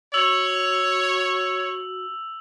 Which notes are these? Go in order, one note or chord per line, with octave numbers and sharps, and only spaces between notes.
F#4 C#5 E6 F7 F#7